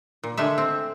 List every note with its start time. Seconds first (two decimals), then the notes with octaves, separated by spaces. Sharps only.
0.24 A#2
0.37 D3 G#3 A3 E5
0.58 C4